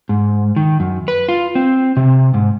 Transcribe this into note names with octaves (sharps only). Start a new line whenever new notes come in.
G#2
D#3
F#2
B4
F4
C4
C3
G#2